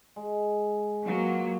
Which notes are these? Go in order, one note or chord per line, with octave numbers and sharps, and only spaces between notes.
G#3
F#3 A#3 F4 F#4 B4